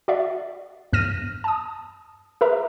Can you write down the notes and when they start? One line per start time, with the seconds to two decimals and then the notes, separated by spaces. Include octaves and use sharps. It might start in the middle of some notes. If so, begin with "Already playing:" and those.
0.08 F#4 D5 E5
0.93 E2 G2 F6 A#6 D#7
1.44 A5 D#6
2.41 G#4 A#4 B4 E5 A#5